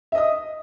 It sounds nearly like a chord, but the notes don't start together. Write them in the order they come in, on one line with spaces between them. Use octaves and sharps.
E5 D#5 D#6